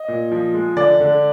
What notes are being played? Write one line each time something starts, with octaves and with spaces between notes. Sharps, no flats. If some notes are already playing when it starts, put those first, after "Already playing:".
Already playing: D#5
A#2
F3
G#3
D3 D5
D3